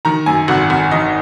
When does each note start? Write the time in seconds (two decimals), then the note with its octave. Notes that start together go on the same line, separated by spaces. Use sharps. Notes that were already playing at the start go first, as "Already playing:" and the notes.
0.05 D#3 A#5
0.26 F#2 G#5
0.48 G#1 F#5
0.70 G#1 F#5
0.91 D#3 D#5